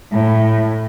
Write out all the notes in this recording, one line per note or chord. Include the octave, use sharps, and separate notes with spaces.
A2